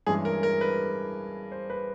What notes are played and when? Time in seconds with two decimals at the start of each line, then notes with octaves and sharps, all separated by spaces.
0.07 G2 E3 G#3 C#4 G#4
0.25 A#4
0.43 A#4
0.61 B4
1.52 C5
1.70 B4